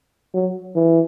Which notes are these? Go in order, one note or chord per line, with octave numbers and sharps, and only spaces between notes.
F#3
E3